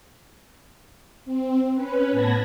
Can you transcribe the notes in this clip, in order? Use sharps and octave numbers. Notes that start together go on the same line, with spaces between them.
C4
C#4 B4
A2 B3 A5 B5 G#6 A#6